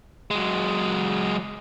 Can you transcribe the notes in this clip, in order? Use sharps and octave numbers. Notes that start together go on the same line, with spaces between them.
F#3 G#3